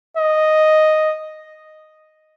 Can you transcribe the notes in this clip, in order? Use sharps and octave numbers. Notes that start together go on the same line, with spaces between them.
D#5